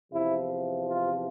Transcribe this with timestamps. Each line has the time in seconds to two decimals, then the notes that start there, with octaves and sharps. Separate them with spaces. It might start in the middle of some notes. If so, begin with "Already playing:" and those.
0.12 E2 C3 F3 E4
0.87 F4